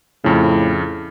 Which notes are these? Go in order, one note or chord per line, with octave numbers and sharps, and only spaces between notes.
F2 A2 C#3